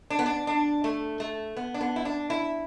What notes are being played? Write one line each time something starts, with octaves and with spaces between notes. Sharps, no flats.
D4
B3
D4
D4
A3
A3
B3
D4
B3
E4
D4
E4